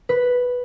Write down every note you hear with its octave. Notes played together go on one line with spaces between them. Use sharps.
B4